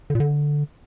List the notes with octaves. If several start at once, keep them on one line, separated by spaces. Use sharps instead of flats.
D3
A#2
D3